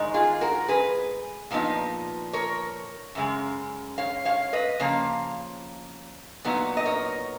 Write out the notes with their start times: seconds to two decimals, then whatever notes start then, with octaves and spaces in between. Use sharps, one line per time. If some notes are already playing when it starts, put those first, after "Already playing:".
Already playing: G#2 D#3 G#3 D#4
0.14 F4 G#4
0.41 F#4 A#4
0.68 G#4 B4
1.51 A#2 F3 B3 D#4
2.33 A#4 C#5
3.15 F#2 C#3 G#3
3.98 C#5 F5
4.25 C#5 F5
4.53 B4 D#5
4.80 C#3 F3 A#3 C#5 F5
6.44 A#2 F#3 B3 D#4
6.77 D#5
6.85 A#4 C#5